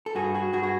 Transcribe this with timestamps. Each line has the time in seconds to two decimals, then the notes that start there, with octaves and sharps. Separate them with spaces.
0.06 A4
0.15 G2 F#4 G#4
0.34 F#4 G#4
0.53 G2 F#4 G#4
0.63 F#4